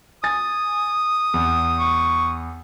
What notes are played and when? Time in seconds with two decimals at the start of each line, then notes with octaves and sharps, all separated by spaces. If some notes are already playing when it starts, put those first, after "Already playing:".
0.24 G#5 D#6 A6
1.34 E2
1.79 C#6